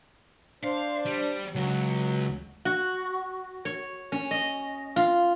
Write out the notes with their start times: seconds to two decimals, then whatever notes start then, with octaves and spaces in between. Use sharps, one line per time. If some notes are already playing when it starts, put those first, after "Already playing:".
0.63 D4 C5 F5
1.05 G3
1.55 C#2 F#3
2.65 F#4
3.65 C#5
4.12 C#4
4.31 D#5
4.96 F4